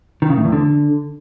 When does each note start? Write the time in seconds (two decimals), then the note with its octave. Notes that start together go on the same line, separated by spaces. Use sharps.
0.22 D#3
0.30 C#3
0.37 A2
0.45 E2
0.52 D3